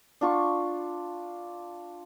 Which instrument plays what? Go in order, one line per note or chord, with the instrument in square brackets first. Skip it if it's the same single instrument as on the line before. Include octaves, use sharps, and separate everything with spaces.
[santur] D4 F4 C#6